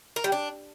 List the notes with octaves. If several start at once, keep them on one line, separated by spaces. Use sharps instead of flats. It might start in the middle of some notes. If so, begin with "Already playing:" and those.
A#4
G3
D4